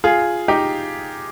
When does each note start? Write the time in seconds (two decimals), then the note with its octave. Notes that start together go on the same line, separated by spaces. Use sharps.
0.04 F4 G#4
0.48 D#4 G4